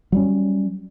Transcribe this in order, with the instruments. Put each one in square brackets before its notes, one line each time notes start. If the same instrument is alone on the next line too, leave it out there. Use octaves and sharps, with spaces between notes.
[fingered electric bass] F#3 G3 C#4